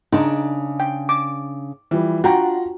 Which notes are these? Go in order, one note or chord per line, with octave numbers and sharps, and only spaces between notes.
C#3 D4 D#4
G5
D6
E3 F3 G3
D4 F4 F#4 F#5 G5 A#5